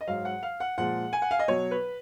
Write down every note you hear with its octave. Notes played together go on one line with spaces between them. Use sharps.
D#5
G#2 F#3 F5
F#5
F5
F#5
A#2 F3 G#3 F#5
G#5
F#5
F5
D#5
B2 F#3 C#5
B4